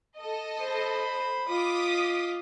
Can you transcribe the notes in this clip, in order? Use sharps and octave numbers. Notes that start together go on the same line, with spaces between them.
A4 D#5
C5 B5
F4 D#5 D6 D#6 B6